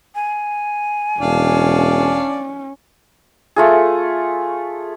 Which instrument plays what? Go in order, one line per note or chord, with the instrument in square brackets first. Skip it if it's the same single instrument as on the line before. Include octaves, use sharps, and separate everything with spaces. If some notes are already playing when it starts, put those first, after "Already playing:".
[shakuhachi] G#5
[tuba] E1 [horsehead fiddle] C#4 [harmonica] D4 D5 F5
[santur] A3 F4 G#4